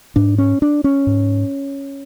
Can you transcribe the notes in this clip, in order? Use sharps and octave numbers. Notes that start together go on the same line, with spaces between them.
G#2 D4
C#4
D4
C#4
G#2